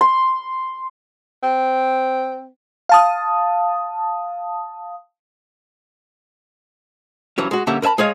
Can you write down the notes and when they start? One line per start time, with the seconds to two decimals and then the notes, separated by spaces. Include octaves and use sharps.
0.01 C6
1.43 C4
2.89 F5 A5 D#6
7.38 G2 E3 F#3 C#4
7.51 G#3 F#4
7.67 G2 D3 A#3 C#4 G4 E5
7.82 A#4 B4 E5 A5 B5
7.98 G#3 G#4 C#5 D#5 F5